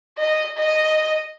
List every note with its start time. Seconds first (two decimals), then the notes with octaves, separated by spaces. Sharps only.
0.18 D#5
0.57 D#5